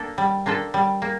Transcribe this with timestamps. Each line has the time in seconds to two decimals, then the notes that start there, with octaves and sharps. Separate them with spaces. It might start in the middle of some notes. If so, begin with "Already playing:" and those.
Already playing: A#3 D4 A4
0.18 G3
0.46 A#3 D4 F4 A4
0.74 G3
1.02 A#3